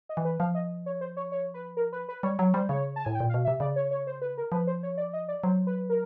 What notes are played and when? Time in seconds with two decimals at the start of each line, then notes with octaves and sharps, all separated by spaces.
0.09 D#5
0.17 E3
0.25 B4
0.40 F3 F5
0.55 D#5
0.86 C#5
1.01 C5
1.17 C#5
1.32 C#5
1.54 B4
1.77 A#4
1.93 B4
2.09 B4
2.23 G3 C#5
2.38 F#3 C#5
2.54 G3 C5
2.69 C#3 C#5
2.96 A5
3.05 A2 G#5
3.15 G5
3.20 A#2
3.29 F5
3.34 B2
3.45 E5
3.48 C3
3.60 C#3 D5
3.76 C#5
3.91 C#5
4.07 C5
4.22 B4
4.38 A#4
4.52 F3 B4
4.67 C5
4.83 C#5
4.98 D5
5.13 D#5
5.28 D5
5.44 F#3 C5
5.67 B4
5.90 A#4